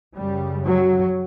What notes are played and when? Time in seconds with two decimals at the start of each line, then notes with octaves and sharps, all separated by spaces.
0.15 F#2 C#3 G3
0.66 F#3